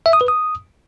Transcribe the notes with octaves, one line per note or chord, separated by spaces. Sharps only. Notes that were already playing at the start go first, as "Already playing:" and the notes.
E5
D#6
B4
D#6